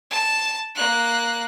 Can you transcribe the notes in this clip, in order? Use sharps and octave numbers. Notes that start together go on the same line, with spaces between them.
A5
A#3 F#6